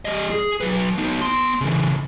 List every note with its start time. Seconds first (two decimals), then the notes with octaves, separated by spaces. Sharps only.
0.05 G3 D#5
0.31 G#4
0.61 F#3 B4
0.98 B3 D#4
1.22 B3 C6
1.61 C#3 E3